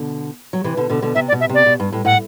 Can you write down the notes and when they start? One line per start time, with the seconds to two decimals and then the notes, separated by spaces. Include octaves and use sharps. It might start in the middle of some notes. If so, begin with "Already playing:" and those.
Already playing: B2 D3
0.53 F#3
0.64 C3 E3
0.77 B2 D3
0.90 B2 D3
1.02 B2 D3
1.15 C3 E5
1.28 D5
1.32 B2
1.40 E5
1.49 C3 D5
1.66 B2
1.80 G2
1.92 A2
2.05 A2 F#5